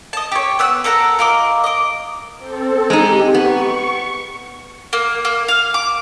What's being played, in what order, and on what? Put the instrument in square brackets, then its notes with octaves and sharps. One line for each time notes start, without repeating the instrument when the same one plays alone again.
[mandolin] D#5 A5
G4 C#5
B3 E6 F#6
A4 A#4 F#5 A#5
F4 A#4 D#5 D6
D#5 D6
[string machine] C4 A4
[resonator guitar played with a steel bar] G#3 D#4 [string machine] G4
[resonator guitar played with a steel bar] B3 [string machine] C#6
[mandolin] A#3
A#3
F5
D6